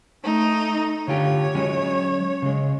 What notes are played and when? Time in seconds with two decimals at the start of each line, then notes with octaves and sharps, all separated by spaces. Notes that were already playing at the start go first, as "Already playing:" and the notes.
0.24 A3 D#4
1.08 D3 F4 G4 C#5
1.55 F#3 G#3 C#4
2.42 C#3 G#3